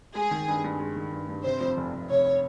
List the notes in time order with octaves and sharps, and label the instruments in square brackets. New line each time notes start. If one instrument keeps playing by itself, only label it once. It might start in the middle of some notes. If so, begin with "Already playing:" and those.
[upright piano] G#3 [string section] G#4
[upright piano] D#3
G2
G2
G#3
D#3
G2
G2
[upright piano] C3 [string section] C5
[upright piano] F2
F1
F1
[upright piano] C3 [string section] C#5